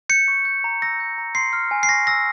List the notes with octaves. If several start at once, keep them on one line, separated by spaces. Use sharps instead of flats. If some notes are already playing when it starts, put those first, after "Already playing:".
G6 C#7
C#6
G6
A#5
E6 A#6
G6
A#5
C6 C7
F6
G#5
C7
C#6 A#6
E6 A#6